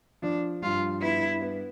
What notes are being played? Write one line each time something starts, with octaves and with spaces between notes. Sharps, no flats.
F3 D4
G2 F4
B3 E4
B3